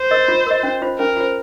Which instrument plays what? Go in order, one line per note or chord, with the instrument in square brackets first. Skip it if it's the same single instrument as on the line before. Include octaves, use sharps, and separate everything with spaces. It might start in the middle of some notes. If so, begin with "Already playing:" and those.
Already playing: [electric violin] C5
[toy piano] A#4 D#5
F4
A#4 D#5
C#4
F4 C5
[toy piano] C#4 [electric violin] A#4
[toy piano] F4 C5